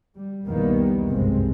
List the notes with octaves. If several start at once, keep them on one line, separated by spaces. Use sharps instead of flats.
G3
B1 E2 D#3 G3 A#3 B3
F#1 C2 G2 C3 G#3 C4